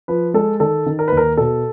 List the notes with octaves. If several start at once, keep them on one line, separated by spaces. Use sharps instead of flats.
F3 B4
G#3 A4
D#3 A4
D#3
A#4
B4
D#2
A#4
B2 A4